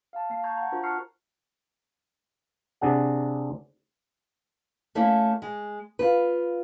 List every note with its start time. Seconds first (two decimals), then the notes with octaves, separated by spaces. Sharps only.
0.13 F5 A5
0.30 A#3 F5 C7
0.44 A5 A#5 C#6 G6 G#6
0.57 F#5 A#5
0.72 D4 F4 F#4 A#4 C5
0.83 A5 C#6 F6 F#6 C7 C#7
2.81 C3 D4 G#4 F#5
4.95 A3 A#3 C#4 E4
5.42 G#3
5.99 F4 B4